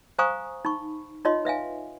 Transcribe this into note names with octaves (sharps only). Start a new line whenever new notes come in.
C5 F5 G#5 A#5 C#6 D#6
D#4 B5 C#6
D#4 F4 C#5 D#5 C6
B4 E5 F5 G#5